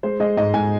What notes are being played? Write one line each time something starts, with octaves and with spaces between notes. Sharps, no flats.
G#3 C5
G#3 D#5
G#2 D#5
G#2 G#5